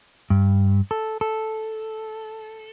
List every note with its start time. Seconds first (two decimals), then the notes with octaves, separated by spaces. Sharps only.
0.30 G2
0.91 A4
1.21 A4